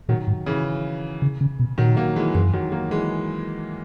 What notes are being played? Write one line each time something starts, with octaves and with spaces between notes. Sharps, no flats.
A#2 D#3 F#3
G#2
C#3 E3
C#3
C#3
B2
A#2 D#3 F#3
F#3 A#3
E3 G#3
F#2 E3 G#3
D#3 F#3
F#3 A#3
E3 G#3